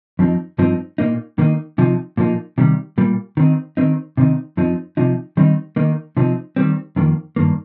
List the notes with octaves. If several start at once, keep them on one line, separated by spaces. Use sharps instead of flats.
F2 F3 C4 D#4
G2 F3 C4 D#4
A#2 A#3 D#4
D#3 A#3 D#4
C3 F3 D#4
A#2 F3 A#3 D#4
C3 D#3 G3
A#2 G3 A#3
D#3 C4 D#4
D#3 C4 D#4
C3 D#3 C4 D#4
F2 F3 C4 D#4
C3 F3 D#4
D#3 G3 C4 D#4
D#3 A#3 D#4
C3 F3 C4 D#4
D#3 G3 C4
F2 D#3 A#3
G2 D#3 A#3